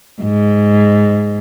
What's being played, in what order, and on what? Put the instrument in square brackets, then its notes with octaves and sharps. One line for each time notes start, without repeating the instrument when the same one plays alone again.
[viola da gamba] G#2